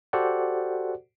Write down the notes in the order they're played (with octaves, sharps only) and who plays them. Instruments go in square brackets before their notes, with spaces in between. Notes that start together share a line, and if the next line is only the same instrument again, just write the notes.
[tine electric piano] F#4 G4 A4 C5 D5 F#5